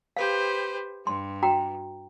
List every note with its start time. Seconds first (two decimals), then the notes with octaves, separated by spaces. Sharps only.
0.17 G4 B4 C5 F5
1.07 G2 C6
1.43 F#4 G5 A#5